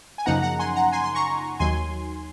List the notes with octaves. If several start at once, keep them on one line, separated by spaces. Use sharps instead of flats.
G#5
F#2 C#3 F3 A#3 D#4 F#5 A#5
F#5 A#5
G#5 C6
F#5 A#5
G#5 C6
C6
A#5 C#6
D#2 D#3 F#3 G#5 C6